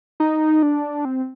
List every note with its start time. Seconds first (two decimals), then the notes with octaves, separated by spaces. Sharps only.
0.20 D#4
0.63 D4
1.05 C4